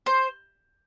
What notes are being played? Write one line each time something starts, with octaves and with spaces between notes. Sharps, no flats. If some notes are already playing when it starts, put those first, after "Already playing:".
C5